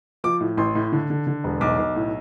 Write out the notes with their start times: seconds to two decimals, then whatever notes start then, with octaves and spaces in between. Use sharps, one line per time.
0.24 F3 D6
0.40 A2
0.57 A1 C6
0.75 A2
0.92 D3
1.10 D3
1.27 D3
1.44 E1
1.61 B1 D6
1.78 B1
1.96 A2